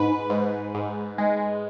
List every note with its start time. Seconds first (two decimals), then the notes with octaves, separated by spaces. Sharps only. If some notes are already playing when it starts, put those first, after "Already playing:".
Already playing: G#2 B4
0.30 G#2
0.75 G#2
1.18 G#3